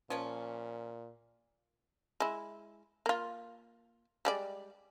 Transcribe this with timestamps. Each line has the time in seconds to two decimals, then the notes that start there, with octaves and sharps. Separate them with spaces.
0.10 A#2 F3 C#4
2.20 G#3 E4
3.06 A#3 F4
4.25 G3 G#3 D5